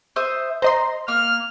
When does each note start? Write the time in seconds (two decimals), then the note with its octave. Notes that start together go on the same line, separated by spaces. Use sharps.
0.16 C5 E5 D#6
0.62 C5 D#5 A#5 C6
1.08 A#3 F6